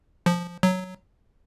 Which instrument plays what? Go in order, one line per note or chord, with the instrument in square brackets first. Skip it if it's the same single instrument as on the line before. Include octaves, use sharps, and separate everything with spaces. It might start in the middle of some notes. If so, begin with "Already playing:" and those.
[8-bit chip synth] F3
F#3